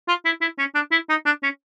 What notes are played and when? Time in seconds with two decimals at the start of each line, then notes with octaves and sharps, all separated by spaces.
0.08 F4
0.25 E4
0.41 E4
0.59 C#4
0.75 D4
0.91 E4
1.10 D#4
1.26 D4
1.43 C#4